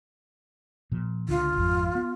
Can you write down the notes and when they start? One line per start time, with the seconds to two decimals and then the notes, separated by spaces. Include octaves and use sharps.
0.92 A#2 F3
1.29 C#2 D3 F4
1.56 G#1 F2
1.95 B3